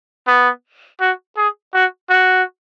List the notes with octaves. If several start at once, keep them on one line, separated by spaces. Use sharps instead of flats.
B3
F#4
G#4
F#4
F#4